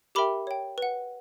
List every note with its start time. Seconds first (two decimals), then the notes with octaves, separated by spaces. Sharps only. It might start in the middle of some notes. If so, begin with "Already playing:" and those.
0.15 G4 A#4 E5 G5 B5 D6
0.47 C#5 G5
0.78 B4 F#5